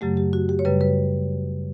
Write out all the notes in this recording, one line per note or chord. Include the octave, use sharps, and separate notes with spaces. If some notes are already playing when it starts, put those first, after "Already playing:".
F#2 C#3 F#3 A3 G4
G4
F#4
G4
C#5
F#2 C#3 G3 B4
B4